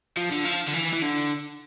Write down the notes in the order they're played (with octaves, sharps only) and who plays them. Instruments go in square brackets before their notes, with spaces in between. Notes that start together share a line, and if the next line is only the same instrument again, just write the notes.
[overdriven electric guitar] F3
D3
F3
D3
E3
E3
D3